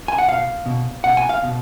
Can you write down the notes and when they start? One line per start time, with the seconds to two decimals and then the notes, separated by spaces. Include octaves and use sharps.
0.08 G#5
0.18 F#5
0.27 B2 F5
0.66 B2
1.04 B2 F#5
1.17 G#5
1.29 F5
1.43 B2